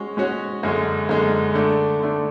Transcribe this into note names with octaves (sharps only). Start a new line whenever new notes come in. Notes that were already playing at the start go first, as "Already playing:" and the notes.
Already playing: G#3 C#4 F#4 C#5
G#3 C#4 F#4 C#5
F#2 D3 G#3
F#2 D3 G#3
D3 A3 D4
D3 A3 D4